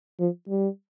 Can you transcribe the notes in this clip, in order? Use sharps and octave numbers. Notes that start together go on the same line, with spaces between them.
F3
G3